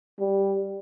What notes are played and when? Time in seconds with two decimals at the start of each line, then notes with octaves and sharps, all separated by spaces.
0.20 G3